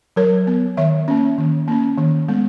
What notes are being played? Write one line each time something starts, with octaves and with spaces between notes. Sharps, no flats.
F#3 A#4 C#5
B3
D#3 C#5 E5
A#3 C#4
D#3
A#3 C#4
D#3
G#3 B3